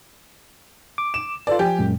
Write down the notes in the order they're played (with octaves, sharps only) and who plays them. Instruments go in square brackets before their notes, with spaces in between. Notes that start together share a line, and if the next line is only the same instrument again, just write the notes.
[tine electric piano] D6
[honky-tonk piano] E7
[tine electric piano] F4 A4 B4 [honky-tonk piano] D5
[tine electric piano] F3 G#5 [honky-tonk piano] G4
[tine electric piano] F#2 A#2 G#3